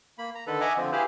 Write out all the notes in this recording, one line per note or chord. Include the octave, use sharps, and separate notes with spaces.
A#3 B5
A#5
D3 D#3 A4 B4
D#5 E5 F#5 G#5 A#5 D6
D3 F3 C4
E4 G4 G#4 B4 C5 F5